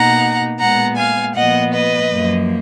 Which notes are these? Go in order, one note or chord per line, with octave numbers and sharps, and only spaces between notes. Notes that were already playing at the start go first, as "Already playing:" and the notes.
Already playing: B2 A#3 D#4 F#5 A#5
A#2 G#3 B3 F#5 A#5
F5 G#5
A#2 F3 B3 D#5 F#5
B4 D#5
F#2 F3 A#3